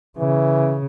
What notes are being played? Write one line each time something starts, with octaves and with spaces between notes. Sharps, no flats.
C#3 E3